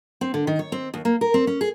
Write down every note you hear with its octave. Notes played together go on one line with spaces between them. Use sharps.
C4
D3
D#3
C#5
C4
D#2
A#3
A#4
C4
C#4
G#4